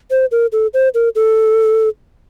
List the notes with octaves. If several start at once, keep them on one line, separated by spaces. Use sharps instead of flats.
C5
A#4
A4
C5
A#4
A4